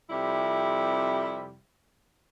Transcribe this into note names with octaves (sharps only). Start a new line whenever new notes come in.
F2 C3 G3 E4